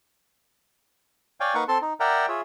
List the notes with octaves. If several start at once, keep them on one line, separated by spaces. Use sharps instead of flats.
C#5 D5 F5 G5 G#5
A#3 D#4 B4 F5 F#5 C#6
C4 A4 A5 C6
D#4
A#4 D5 E5 F#5 G5 A#5
F4 G#4 C#5 E5